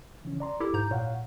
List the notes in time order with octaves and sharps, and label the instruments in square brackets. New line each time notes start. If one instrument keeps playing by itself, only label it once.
[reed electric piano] C#3 E3 C#4
D5 A#5 C6
[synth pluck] E4 G4 A4 [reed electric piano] D6
[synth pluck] G#2 A#5 G6
[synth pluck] A#2 [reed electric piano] C#5 F5 F#5